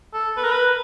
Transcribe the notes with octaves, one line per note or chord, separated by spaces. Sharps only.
A4
B4
A#4
B4